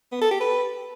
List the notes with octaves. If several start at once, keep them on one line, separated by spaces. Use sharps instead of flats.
B3
A4
G4
B4